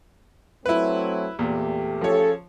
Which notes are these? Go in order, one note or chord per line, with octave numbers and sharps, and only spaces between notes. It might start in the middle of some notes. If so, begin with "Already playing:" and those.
F#3 A3 C4 E4 B4
E2 A#2 A3 G4
C#3 F3 A4 C#5